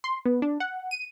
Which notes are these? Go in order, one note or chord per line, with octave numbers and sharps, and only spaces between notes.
C6
B3
D4
F#5
D#7